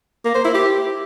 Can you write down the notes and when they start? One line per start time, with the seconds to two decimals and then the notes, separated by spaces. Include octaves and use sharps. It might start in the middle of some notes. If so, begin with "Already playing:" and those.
0.25 A#3
0.35 C5
0.45 E4
0.54 G4